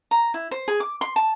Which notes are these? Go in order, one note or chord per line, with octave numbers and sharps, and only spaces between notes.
A#5
E4
C5
G#4
D6
C6
A5